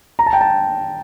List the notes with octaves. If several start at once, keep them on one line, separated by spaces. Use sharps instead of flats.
A#5
A5
G5
A5